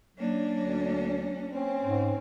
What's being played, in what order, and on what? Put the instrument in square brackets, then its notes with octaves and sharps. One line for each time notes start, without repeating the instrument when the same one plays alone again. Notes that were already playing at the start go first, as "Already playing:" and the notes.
[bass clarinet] F#3 [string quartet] A#3 C#4 D4
[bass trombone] D2
[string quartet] C4 [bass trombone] C#4
[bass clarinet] G#2